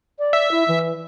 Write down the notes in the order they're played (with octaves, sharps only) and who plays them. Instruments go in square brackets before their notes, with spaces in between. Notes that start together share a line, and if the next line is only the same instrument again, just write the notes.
[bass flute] D5
[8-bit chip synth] E5
[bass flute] E4
E3